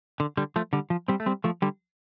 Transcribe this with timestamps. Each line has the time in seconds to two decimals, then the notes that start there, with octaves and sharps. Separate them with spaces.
0.20 D3
0.37 D3 G3
0.56 F3 A3
0.73 D3 G3
0.90 F3
1.08 G3 C4
1.20 A3
1.26 G3 C4
1.44 F3 A3
1.62 D3 G3